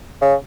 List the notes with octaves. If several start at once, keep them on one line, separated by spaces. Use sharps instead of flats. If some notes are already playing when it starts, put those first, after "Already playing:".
C#3